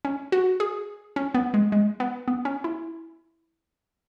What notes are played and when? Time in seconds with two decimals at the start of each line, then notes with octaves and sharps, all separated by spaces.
0.05 C#4
0.32 F#4
0.60 G#4
1.16 C#4
1.34 B3
1.54 G#3
1.72 G#3
2.00 B3
2.28 B3
2.45 C#4
2.64 E4